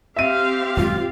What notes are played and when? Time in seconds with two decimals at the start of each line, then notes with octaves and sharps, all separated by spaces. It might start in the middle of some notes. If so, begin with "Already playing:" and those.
0.16 C4 G4 E5 F5 D#7
0.77 D#1 F#2 G#3 F4